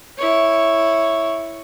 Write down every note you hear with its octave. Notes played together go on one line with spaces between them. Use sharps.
E4 C#5